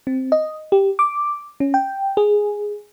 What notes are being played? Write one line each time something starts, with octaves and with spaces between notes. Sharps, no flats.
C4
D#5
G4
D6
C#4
G5
G#4